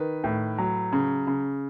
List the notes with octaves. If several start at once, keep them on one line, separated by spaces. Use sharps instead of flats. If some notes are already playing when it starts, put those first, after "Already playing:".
Already playing: D#3 B4
A2
F#3
C#3
C#3